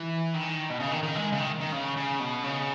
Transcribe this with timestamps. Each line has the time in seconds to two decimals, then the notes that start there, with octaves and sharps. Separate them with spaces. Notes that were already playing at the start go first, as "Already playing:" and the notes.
Already playing: E3
0.34 D#3
0.70 B2
0.80 C#3
0.92 D#3
1.03 D#3
1.16 G#3
1.32 C#3
1.38 D#3
1.61 D#3
1.73 C#3
1.97 C#3
2.20 B2
2.43 C#3